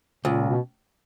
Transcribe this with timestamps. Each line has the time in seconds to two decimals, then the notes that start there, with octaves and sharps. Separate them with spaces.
0.25 C#2 A#2
0.49 B2